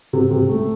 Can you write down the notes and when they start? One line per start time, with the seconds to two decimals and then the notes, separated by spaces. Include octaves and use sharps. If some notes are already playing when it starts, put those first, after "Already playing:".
0.13 C3
0.31 C3
0.49 A3